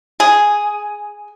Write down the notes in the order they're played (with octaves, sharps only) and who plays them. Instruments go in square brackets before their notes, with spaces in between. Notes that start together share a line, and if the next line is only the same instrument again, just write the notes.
[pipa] G#4